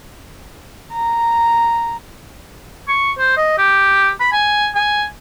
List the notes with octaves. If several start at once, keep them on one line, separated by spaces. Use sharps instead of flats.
A#5
C#6
C5
D#5
G4
B5
G#5
G#5